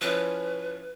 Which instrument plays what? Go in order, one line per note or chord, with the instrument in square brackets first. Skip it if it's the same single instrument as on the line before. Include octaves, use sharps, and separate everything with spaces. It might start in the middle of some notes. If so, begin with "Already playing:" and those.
[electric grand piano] F3 C#4 E4 [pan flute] B4